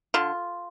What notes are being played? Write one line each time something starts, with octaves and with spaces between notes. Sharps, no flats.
D3 F4